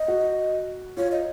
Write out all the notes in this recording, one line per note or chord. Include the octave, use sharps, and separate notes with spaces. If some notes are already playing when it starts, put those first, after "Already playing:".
Already playing: D#5
F#4
F4 C#5
D#5